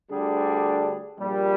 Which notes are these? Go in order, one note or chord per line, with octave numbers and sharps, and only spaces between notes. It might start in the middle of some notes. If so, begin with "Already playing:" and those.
D2 D3 G3 D4 G#4
A#1 A#2 G3